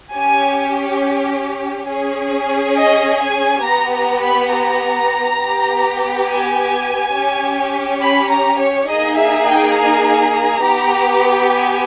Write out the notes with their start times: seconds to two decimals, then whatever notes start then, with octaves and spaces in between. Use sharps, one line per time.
0.13 C#4 G4 G#5
1.88 C#4 G#4
2.76 D#5
3.20 G#5
3.63 B3 G4 A#5
3.93 A#5
4.22 B5
4.51 A#5
5.38 B3 G4
6.26 G#5
7.13 C#4 G4
8.01 B5
8.30 A#5
8.59 C#5
8.89 A#3 D#4 G#4 D#5
9.18 E5
9.47 G5
9.76 A#5
10.64 B3 G4
11.51 G#5